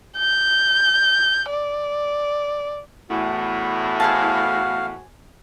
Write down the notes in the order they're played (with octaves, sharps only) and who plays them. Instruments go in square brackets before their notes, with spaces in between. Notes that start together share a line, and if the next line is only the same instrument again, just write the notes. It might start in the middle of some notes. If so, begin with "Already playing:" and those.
[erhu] G6
D5
[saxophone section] E2 A2 [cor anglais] F#4
[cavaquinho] G#4 C5 A5 [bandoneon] F5